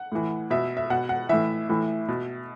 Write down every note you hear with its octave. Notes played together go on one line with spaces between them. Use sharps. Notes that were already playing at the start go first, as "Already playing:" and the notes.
Already playing: F#5
A2 E3
B2 E5
E5
B2 F#5
F#5
A2 E3 E5
A2 E3
B2